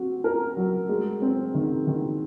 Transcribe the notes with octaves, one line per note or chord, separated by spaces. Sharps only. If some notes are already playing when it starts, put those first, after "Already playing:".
Already playing: C4 F#4
A#4
F#3
G#3
C4
D#3
D#3